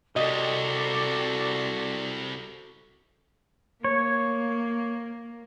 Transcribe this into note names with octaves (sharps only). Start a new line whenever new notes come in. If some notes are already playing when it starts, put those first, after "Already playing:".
C2 C3 F#4 A4 D5 D#5
A#3 C#5